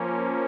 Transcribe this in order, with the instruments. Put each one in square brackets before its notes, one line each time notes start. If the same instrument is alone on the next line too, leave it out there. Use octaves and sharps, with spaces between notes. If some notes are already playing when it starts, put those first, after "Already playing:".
Already playing: [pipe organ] F3 A#3 C#4